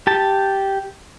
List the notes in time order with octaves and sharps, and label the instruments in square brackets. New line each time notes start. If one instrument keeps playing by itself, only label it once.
[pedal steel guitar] G4 A5